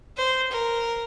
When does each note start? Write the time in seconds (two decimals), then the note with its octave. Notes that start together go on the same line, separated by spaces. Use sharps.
0.17 C5
0.52 A#4